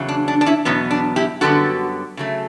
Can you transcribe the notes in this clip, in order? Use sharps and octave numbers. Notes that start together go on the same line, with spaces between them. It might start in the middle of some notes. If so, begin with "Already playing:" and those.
Already playing: E2 C#3 F#3
D4
D4
D4
C#4 E4
E2 B2 F#3 B3 C#4
D4
E4 G4
F#2 D3 G3 B3 F#4 A4
C#3 F#3 A3